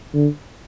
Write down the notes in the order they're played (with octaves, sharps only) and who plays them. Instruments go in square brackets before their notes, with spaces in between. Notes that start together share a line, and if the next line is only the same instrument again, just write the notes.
[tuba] D3